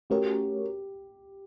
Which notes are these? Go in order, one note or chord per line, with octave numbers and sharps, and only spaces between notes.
A3 C#4 F#4 G4 A#4 C#5